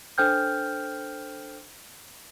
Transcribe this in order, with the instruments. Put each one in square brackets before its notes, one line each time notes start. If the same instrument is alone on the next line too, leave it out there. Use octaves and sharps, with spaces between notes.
[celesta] D4 A4 C5 G5 F6 G6